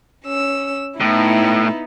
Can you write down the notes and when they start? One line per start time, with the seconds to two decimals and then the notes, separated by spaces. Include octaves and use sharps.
0.24 C#4 E6
1.01 A2 B3 D#4 E4